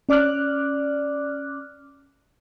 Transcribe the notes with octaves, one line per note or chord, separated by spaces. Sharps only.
C#4 D5 D6 F6 F#6